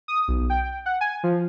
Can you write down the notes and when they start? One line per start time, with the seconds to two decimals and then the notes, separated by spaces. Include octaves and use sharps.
0.08 D#6
0.28 B1
0.50 G5
0.86 F#5
1.01 G#5
1.23 F3